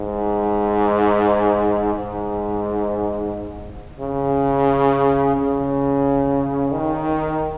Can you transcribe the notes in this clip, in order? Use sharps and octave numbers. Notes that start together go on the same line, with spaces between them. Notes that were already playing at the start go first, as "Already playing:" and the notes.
Already playing: G#2
G#2
C#3
C#3
D#3